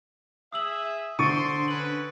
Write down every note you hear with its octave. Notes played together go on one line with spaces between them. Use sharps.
G#4 E5 D#6 E6 F#7
D3 C5 C6 C#6 A6 D7 D#7
C#4 B4 F#7